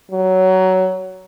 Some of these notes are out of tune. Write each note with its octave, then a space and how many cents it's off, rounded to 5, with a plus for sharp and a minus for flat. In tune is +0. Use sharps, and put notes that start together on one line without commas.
F#3 +15